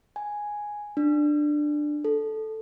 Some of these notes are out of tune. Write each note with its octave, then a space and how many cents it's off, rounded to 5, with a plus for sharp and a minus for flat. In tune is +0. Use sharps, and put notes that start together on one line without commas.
G#5 +0
D4 +15
A4 -5